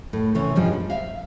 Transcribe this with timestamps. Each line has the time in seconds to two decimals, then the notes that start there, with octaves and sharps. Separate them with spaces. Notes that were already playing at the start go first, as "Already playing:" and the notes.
0.13 A2
0.35 C3 E3 C#4 C#5
0.55 G2 B2 F3 G3 G#3 C#4
0.73 G3
0.90 E5 F5